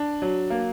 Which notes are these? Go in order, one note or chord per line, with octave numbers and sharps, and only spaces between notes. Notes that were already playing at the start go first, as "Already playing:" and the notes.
Already playing: D4
F#3
A#3